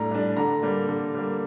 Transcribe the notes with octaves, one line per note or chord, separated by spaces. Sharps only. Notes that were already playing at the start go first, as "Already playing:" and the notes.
Already playing: A2 G3 D4 A#5
G3 D4
D3 A#5
G3 A#3
D3
G3 A#3